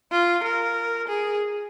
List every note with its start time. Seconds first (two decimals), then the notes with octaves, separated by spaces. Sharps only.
0.12 F4
0.44 A#4
1.08 G#4